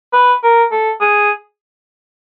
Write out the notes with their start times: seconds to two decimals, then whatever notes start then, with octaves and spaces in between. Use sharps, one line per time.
0.13 B4
0.43 A#4
0.71 A4
1.01 G#4